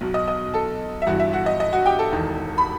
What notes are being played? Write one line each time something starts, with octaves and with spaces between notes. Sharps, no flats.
B1 B2
D#5 D#6
D#5 D#6
A4 A5
E5
G1 G2 E3 F#4 F#5
E5
F#4 F#5
D#5
D#5
F#4 F#5
G4 G5
A4 A5
E1 E2 D#3
B5